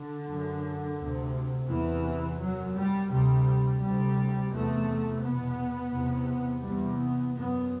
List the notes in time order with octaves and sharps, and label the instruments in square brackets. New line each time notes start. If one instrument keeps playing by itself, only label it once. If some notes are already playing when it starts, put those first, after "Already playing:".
Already playing: [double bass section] D3
F#2
D2 C3
E2 C3 E3
F#2 F#3
G3
D2 C3 G3
D2 C3 G3
E2 C3 A3
E2 B2 B3
E2 C3
E2 C3 G3
B3
F#2 B3